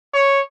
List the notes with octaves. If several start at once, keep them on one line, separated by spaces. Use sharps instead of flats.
C#5